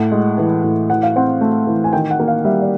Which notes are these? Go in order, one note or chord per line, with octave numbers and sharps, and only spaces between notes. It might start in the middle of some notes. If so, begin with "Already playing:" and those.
Already playing: A2 F#5
G#3
E3
A2
E3 F#5
F5
C4 F#5
A3
E3
G#5
D#3 G5
F#5
A#3
F5
G3 E5
D5